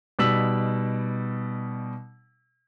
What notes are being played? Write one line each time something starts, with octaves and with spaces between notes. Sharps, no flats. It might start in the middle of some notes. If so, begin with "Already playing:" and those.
B2 G3 D#4 E6 B6 F#7